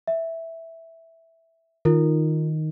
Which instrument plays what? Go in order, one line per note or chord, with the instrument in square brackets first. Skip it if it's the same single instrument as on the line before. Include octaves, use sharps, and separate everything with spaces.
[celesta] E5
[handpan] D#3 [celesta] F4 A#4